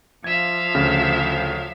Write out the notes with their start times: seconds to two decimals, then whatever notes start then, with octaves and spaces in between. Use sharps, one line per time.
0.24 F3 E5 F5 G#6
0.75 D2 C#3 F6